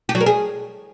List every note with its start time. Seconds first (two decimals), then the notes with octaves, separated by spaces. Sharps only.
0.09 G4
0.15 F#3
0.21 A#4
0.26 G#4